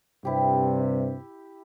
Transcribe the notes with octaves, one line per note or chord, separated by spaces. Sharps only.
G2 C3 E4 G4